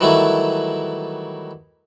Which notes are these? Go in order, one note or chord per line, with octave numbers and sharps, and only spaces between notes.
D#3 E3 F#3 G3 A3 E4